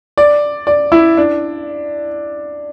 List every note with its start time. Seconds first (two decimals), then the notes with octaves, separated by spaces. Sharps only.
0.18 D5
0.67 D5
0.92 E4
1.17 D4